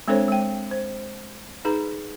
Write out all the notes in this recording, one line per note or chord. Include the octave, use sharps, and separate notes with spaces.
G#3 C4 D4 A4 C5 C#5
G#3 G5
C5
D#4 G#4 B4 A#5